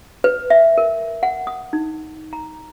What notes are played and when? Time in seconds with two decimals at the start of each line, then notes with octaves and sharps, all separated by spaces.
0.24 B4
0.50 E5
0.78 A#4
1.23 F#5
1.47 D#6
1.73 D#4
2.33 A#5